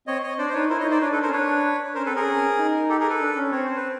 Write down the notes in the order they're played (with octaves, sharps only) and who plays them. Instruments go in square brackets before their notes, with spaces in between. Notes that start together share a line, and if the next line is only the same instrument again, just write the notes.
[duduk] C4 [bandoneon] C#5 D#5
[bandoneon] C#5 D#5
[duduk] D4 [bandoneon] C5 D5
[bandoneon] C5
[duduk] D#4 [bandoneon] B4 C#5
[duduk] E4 [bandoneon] A#4 C5
[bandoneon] C#5 D#5
[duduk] D#4
[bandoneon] C5 D5
[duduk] D4 [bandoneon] B4 C#5
[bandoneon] A4 B4
A#4 C5
[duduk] C#4
[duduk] D4 [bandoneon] B4 C#5
[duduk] C#4 [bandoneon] A#4 C5
[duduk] C4 [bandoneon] A4 B4
[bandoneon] G#4 A#4
[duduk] C#4
D#4
[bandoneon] G4 A4
G#4 A#4
A4 B4
[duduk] D4
C#4
[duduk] C4 [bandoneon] C#5
[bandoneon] C5
B4